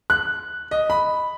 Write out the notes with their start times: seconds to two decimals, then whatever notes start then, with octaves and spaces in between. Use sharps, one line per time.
0.10 F#6
0.71 D#5
0.90 B5